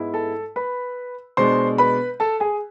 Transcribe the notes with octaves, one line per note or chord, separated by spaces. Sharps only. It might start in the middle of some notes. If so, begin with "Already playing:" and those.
Already playing: G#2 G#3 B3 E4
A4 A5
B4 B5
B2 G#3 D4 C5 C6
B4 B5
A4 A5
G#4 G#5